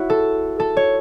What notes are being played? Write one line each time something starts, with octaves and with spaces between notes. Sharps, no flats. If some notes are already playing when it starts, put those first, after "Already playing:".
Already playing: E4 F#4 C#5
A4
A4
C#5